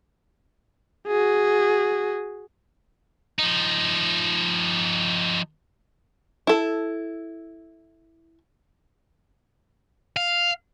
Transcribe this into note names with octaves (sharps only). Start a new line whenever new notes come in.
F#4 G#4
F3 D#4
E4 A4
F5